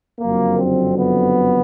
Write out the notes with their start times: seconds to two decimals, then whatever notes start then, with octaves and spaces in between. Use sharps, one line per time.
0.20 F#1 F2 D3 F#3 A#3
0.58 C4
0.99 B3